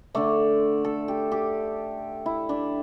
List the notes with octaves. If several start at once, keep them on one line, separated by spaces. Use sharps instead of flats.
D3 A3 D5
A4
G4
G4
E4
D4